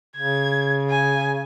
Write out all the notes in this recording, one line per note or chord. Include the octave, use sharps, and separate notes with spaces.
C#3 G#6
G#5